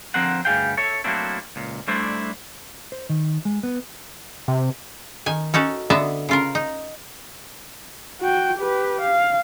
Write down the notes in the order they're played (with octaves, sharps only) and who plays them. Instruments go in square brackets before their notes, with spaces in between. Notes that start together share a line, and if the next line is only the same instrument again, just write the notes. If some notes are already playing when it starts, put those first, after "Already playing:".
[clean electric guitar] D3 F3 C4 A#4 C5 F#5
D2 G2 G3 G#4 F5 G5
A4 C#5 E5
F#3 A3 A#3 C4 D4 E4
C#2 A#2
G3 A3 D4 E4 C5 D5
C5
D#3
G#3
B3
[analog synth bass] C3
[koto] D#3 G#5
C#4 D#4 F#4 A4
D3 B3 D#5 E5 A5
C#3 F4 A#4
D#4
[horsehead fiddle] F#4 G5
G4 B4
F5